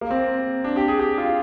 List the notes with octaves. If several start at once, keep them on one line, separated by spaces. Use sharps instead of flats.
A#3
C4
D4
G4
G#4
G4
F4